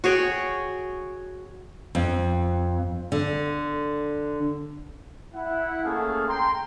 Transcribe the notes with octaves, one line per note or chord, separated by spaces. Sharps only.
F#4 G#4 C#5 G5
F2
D3
E4 F#5
A3 A#3 C#4 G#4 A4 F5
G5 A#5 C6